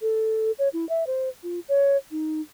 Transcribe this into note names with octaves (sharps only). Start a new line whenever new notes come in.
A4
C#5
E4
E5
C5
F4
C#5
D#4